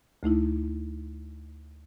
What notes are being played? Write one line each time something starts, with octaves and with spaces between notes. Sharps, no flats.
D2 A3 D#4 E4